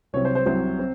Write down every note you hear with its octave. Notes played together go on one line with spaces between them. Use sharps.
C2 C3 F#3 C4 C#5
C5
C5
C2 C3 F#3 C4 C5
C4